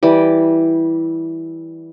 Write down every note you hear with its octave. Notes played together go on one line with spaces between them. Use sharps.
E3 G3